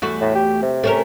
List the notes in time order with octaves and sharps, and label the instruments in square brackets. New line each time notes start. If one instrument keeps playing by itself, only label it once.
[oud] E2 A3 F#4
[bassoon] A2
G4
C3
[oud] A3 C#4 A#4